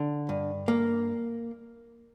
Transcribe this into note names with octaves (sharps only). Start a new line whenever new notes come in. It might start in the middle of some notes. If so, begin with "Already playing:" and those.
Already playing: D3
G2
A#3